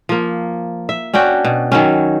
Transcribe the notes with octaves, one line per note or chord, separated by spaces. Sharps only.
F3 A#3
E5
C#4 D4 F#4 G5
B2
D#3 F#3 C#4